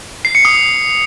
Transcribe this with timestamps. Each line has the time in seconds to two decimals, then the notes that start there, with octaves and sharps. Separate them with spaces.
0.25 C7
0.35 C#7
0.45 D#6